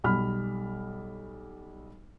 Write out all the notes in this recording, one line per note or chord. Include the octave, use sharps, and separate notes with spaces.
B1 G3 B5 F6